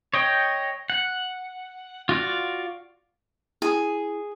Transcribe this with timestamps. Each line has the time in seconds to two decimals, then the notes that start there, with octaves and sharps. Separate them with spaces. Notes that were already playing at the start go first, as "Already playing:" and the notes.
0.14 C#5 D#5 G5
0.90 F#5
2.09 F4 F#4 D5 F5
3.62 E4 G#4